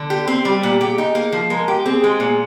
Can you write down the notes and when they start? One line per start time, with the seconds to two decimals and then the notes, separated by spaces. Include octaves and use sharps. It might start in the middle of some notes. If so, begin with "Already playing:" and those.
Already playing: D3
0.10 G4
0.27 C4
0.45 G3 G4
0.63 A#2
0.81 G4 G#4
0.98 D#4
1.15 A#3
1.32 F3
1.50 G#3 A#4
1.68 G4
1.86 C4 G#4
2.04 G#3
2.20 A#2